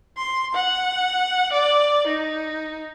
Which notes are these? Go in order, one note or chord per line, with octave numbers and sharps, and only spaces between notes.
C6
F#5
D5
D#4